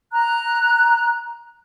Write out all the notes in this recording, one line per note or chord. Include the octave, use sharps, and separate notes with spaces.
A#5 F#6